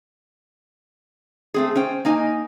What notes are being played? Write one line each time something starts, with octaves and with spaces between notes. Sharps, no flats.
A3 C4 G#4
C#4 C5 G5
A#3 D#4 G#5